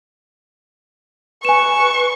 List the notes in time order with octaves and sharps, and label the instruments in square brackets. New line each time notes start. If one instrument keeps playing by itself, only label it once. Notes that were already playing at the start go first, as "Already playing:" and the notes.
[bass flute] B4 [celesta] G#5 E7 [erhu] C#6